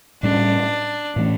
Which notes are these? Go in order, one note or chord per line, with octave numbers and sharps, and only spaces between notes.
A2 G3 C#4 D4
A2 E3 A3 C#4